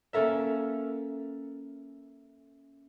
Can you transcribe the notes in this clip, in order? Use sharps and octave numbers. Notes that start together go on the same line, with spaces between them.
A#3 C#4 A4 A#4 E5